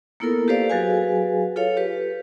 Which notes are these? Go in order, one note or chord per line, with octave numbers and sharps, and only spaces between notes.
A#3 B3 E4 F4 A4 A#4
G4 A4 B4 C5 D5 F5
F#3 F#4 G#4 B4 F5 G#5
F4 A4 C#5 F5
G4 B4